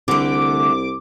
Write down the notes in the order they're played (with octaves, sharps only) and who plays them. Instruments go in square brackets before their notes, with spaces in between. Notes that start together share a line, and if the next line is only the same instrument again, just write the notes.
[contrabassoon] C2 [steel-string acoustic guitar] D3 A3 [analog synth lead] D6